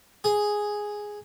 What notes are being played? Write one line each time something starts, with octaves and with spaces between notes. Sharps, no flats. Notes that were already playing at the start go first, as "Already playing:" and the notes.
G#4